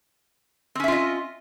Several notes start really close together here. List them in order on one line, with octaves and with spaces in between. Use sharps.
C4 C#4 E5 F4 D#5